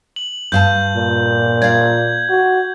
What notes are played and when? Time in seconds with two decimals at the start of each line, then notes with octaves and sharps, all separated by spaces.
0.16 F#7
0.52 G2 F5 A5 G6
0.96 A#2
1.62 D5 F5 G#6
2.29 F#4